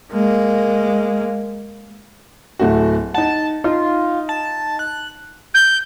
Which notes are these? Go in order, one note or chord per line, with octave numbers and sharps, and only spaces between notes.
G#3 A#3
D1 A3 F#4
D#4 F#5 A5
D#4 F4
A5
F#6
G6